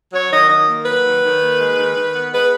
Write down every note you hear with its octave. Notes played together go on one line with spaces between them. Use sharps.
F#3 C#5
D#3 D#5
D#3 D#5
A#3
F#3 B4
D#3
D#3
A#3
G#3
D#3
D#3
B3
G#3 B4